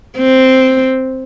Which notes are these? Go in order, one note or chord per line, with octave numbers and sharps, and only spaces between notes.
C4